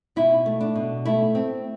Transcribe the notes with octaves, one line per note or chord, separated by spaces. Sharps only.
B2 E4
A3
D4
B2
A3 E4
C4